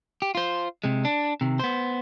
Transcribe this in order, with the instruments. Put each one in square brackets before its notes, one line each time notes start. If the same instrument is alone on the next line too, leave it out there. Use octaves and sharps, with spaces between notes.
[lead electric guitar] G4
F4 C5
C3 G#3
D4
C3 D#3
B3 C5